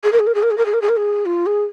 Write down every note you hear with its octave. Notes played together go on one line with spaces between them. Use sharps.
G#4
A#4
G#4
A#4
G#4
A#4
G#4
A#4
G#4
A#4
G#4
A#4
G#4
F4
G#4